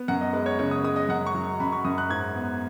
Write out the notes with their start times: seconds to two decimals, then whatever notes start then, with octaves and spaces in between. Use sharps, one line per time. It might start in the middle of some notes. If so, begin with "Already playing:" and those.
Already playing: B3
0.08 F#2 F#5
0.21 D#5
0.33 G#3 B4
0.46 C#5
0.59 C#3 C#5
0.71 D#6
0.84 G#3 D#6
0.96 D#5
1.09 F#2 F#5
1.26 C#6
1.35 F#3
1.60 F#2 B5
1.72 C#6
1.85 F#2 D#6
1.98 F#6
2.10 G#2 G#6
2.35 B3